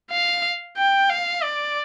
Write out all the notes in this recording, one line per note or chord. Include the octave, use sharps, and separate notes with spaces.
F5
G5
F5
D5